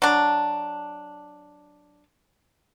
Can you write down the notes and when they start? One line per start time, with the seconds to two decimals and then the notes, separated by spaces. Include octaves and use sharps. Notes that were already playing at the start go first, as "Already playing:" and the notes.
0.02 F#3 D4